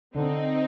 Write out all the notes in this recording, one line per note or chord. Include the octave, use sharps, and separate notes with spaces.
D3 C4 D#4